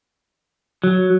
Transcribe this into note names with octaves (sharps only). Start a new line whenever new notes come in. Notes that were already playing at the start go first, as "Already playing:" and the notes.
F#3